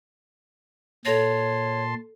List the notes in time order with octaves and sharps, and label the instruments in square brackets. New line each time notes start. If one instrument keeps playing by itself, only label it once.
[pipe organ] A#2 A5 C6 [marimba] A4 A#6 [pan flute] C#5